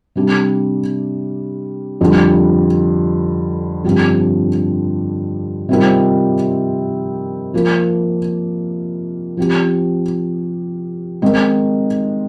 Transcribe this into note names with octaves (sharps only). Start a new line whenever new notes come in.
C3 G3 D4 G4
F2 D3 G3
G2 D3 F3 C4 G4
C3 D#3 G3 C4 F4
F3 A#3 F4
F3 C4 G4
D#3 G#3 C4 D#4